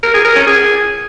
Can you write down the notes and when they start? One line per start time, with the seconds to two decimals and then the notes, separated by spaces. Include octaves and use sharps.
0.03 A#4
0.14 G#4
0.25 A#4
0.36 C#4
0.47 G#4